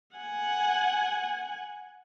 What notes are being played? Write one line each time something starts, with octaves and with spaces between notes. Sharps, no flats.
F#5 G#5